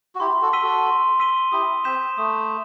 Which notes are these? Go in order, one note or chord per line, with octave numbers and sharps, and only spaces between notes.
F#4
E4 G4 C6
F#4 A4
E6 B6 D#7 G7
F#4 A4
C6
E6 B6 D#7 G7
E4 G4 D#6
C4 G6 B6 E7
A3 D#6